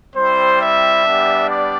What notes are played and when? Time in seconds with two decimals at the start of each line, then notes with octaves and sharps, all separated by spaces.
0.15 G3 C4 E4 C5
0.59 E5
1.04 G3 B3 D4 G4
1.48 D5